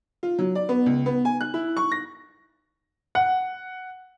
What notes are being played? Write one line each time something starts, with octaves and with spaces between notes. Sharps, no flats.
F4
F#3
D5
B3
C#2
B3
G#5
F#6
E4
C#6
A#6
F#5